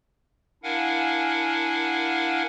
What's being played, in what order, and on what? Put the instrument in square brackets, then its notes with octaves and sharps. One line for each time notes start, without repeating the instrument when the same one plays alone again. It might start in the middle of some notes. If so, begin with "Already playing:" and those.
[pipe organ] D4 E4 A#4 F5 F#5 G#5